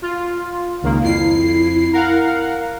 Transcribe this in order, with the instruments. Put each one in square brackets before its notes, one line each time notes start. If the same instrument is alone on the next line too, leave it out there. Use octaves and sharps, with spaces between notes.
[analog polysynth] F4
C#2 D#3 A#3
[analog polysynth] F2 C7 [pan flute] E4
[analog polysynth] A#4 F5 F#5